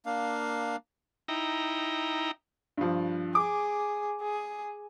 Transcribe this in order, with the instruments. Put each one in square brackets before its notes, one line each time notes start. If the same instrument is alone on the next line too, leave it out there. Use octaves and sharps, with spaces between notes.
[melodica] A#3 D4 F5
[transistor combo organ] D#4 E4 G5 A#5
[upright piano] G2 F3
[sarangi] G#4 [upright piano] D6
[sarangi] G#4